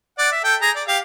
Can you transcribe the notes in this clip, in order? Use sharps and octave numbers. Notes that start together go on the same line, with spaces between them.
D5 F#5
E5
A4 G5
G#4 A#5
D5
G4 F5